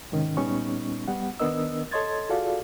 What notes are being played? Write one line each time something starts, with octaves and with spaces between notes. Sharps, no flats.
G#2 C3 D#3 C#4
A#2 G3 B3 C#4 D#4 C#6
G3 B3 F#5
D#3 B3 D4 A#4 D#5 E6
A4 C#5 D#5 C6 G#6 A6
F4 F#4 G#4 A4 D5 F5